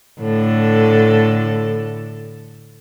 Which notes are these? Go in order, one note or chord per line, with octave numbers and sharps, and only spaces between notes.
A2 D3 A4